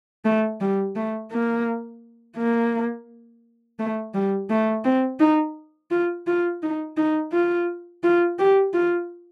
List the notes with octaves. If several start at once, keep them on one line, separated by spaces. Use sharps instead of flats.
A3
G3
A3
A#3
A#3
A3
G3
A3
C4
D#4
F4
F4
D#4
D#4
F4
F4
G4
F4